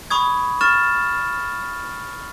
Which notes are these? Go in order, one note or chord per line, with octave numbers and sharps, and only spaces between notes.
B5 C#6 D#6 G#6
C#6 F6 A6 E7